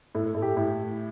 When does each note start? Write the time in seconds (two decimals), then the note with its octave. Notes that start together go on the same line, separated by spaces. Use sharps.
0.15 A2 A4
0.34 A2 A4
0.42 G4
0.57 A2